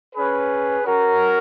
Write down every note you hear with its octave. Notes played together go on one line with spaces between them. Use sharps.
C#4 G#4 B4
C#4 F#4 A#4